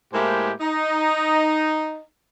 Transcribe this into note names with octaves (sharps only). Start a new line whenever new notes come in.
A2 G#3 A#3 E4 G4 C5
D#4